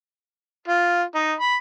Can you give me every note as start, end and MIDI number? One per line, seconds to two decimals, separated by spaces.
0.68 1.03 65
1.15 1.33 63
1.41 1.55 83